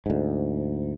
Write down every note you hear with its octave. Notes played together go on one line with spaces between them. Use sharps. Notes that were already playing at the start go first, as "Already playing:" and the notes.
D2 G#2